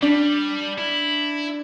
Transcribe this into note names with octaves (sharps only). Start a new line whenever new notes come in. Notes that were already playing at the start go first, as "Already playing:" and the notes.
G3 D4
E4